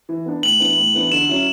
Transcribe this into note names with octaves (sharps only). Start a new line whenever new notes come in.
E3
B3 D4
A2 F#7
E3 B3 D4
A2
E3 B3 D4
D3 E7
F#3 C#4 E4